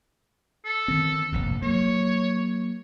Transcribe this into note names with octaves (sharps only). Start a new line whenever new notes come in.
A4
D#3 C4
F1 A#1 G2
F#3 A#3 C#5